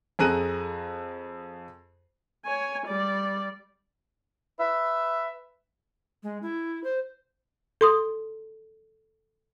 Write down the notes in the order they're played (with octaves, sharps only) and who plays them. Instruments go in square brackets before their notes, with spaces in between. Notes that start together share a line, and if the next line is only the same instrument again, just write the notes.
[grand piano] F2 G#4 A4 A#5 F#6 D#7
[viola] C#5 G#5
G3 D5
[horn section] B4 E5
[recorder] G#3
E4
C5
[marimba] A4 C6 D#6